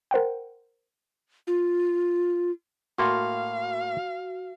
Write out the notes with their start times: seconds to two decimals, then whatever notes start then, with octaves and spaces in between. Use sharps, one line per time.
0.11 A#4 C5 F#5 G5
1.47 F4
2.98 A2 A#3 F#4 A4 F5 C6